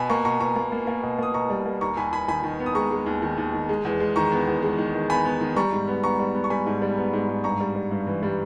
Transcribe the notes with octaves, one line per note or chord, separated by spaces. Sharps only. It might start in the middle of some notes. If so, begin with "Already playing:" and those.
Already playing: B2 G#5 B5
A#3 A#5 C#6
B2 A#5 C#6
B2 A#5 C#6
A#3
A#3
A#3
B2
A#3 D#6
B2 A#5 C#6
G3
A#3
D#2 A#5 C#6
D#2 G#5 B5
D#2 G#5 B5
D#3 G#5 B5
D#3
B3
D#6
G#3 A#5 C#6
G#3
D#2
D#3
D#2
D#3
G#3
E2
G#3
D#3 A#5 C#6
B3
E2
G#3
D#3
D#3
B3 G#5 B5
B3
D#3
G3 A#5 C#6
G#2
B3
B3 A#5 C#6
G3
B3
C#6
G3 G#5 B5
G#2
G3
B3
G#2
G#2
G2 A#5 C#6
G3
G3
G2
E3
G3